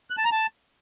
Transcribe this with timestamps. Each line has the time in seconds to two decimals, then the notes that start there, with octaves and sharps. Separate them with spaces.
0.10 F#6
0.18 A5
0.25 A#5
0.32 A5